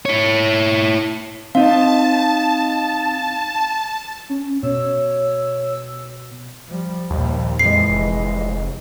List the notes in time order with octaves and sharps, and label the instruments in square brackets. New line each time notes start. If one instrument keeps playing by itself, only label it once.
[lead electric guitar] E4 C#5
[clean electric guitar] C4 D#4 [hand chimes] F5 [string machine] A5
[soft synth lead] C#4
[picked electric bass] B2 [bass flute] C#5 [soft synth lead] E6
[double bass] F3 G3
[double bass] A#1 G3 [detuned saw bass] D#2
[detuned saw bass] F2 [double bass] E3 G#3 [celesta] C7
[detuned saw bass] F1